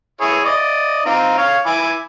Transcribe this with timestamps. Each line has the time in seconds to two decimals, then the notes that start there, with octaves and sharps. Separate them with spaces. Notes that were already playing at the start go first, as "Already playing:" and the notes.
0.21 E4 G#4 C#5
0.45 D5 D#5
1.06 C4 D#4 F4
1.38 C#5 F5
1.66 E4 G#5 D6